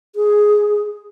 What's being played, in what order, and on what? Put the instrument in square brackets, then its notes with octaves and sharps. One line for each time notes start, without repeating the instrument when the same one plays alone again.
[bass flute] G#4